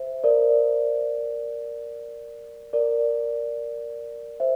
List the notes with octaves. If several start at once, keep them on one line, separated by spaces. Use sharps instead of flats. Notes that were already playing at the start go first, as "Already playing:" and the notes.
Already playing: C5 E5
A#4 D5
A#4 D5
C5 E5